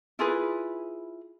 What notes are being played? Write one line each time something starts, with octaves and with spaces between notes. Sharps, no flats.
E4 F4 G#4 B4